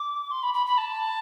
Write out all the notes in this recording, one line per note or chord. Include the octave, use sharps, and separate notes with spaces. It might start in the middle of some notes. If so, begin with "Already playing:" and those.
Already playing: D6
C6
B5
B5
B5
A5